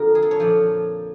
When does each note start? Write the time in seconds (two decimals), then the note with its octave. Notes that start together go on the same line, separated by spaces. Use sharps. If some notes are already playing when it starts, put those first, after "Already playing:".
Already playing: F2 D3 F3 A#4
0.15 G#4
0.22 A4
0.31 C#5
0.40 A#2 F3